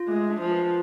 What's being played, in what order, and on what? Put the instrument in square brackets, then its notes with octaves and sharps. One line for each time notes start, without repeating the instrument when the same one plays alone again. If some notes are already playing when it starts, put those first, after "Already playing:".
Already playing: [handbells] F4
[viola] G#3 [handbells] A3
[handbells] D4
[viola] F3
[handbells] B4